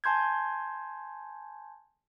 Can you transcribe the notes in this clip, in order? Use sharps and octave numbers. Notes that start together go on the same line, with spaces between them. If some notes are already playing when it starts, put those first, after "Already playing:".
G#5 A5 C6 G6 G#6